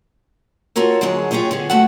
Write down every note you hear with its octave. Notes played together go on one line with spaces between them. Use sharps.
F4 F#4 A4 A#4 C#5
D3 F#3 G#3 D4 G#4 C#5
F4 G4 G#4 C#5 D#5
D3 B3 G#4
A3 F#4 A4 E5 F#5